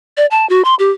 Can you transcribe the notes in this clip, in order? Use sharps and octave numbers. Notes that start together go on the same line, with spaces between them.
D5
A5
F#4
C6
G4